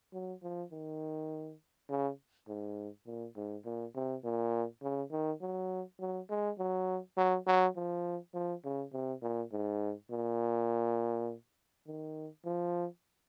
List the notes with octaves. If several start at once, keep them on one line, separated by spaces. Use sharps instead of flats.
F#3
F3
D#3
C#3
G#2
A#2
G#2
A#2
C3
A#2
C#3
D#3
F#3
F#3
G#3
F#3
F#3
F#3
F3
F3
C#3
C3
A#2
G#2
A#2
D#3
F3